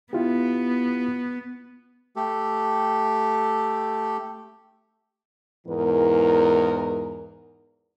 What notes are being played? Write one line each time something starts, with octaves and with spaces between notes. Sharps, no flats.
B3 E4 F4 G4
A3 G4 A4
E2 G#2 E3 A#4